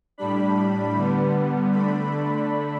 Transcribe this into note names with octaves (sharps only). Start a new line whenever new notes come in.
A2 G3 D4 B5
D3 G3 B3
D3 A3 D4 B5